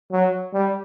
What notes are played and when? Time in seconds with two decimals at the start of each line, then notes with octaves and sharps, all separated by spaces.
0.12 F#3
0.53 G3